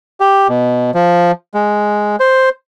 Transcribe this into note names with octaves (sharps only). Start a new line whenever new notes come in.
G4
B2
F3
G#3
C5